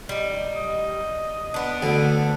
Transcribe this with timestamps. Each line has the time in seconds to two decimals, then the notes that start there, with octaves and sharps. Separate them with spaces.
0.09 G3 D#4
0.56 D#5
1.54 B3 D4
1.82 D2 D3 A4